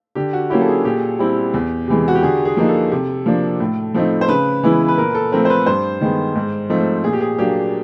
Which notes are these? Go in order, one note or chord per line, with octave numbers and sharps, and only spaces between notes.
D3 G4
F#4
F#3 A#3 C#4 E4 G4
A4
G#4
A#2 G4
G3 C4 E4
E2
C3 E3 G#3
F#4
G4
D3 G#4
G#4
F3 A#3 D#4
A4
C3
F3 A#3 D4
A2
F3 A3 C4 D#4
C5
C#3 B4
E3 G#3 B3 E4
B4
A#2 A#4
A4
F3 A3 C4 A#4
C5
B4
G2 C5
D#3 G#3 B3
G#2
F3 A3 C4 D#4
A#2 G#4
G4
G#4
F#3 A#3 D4 G4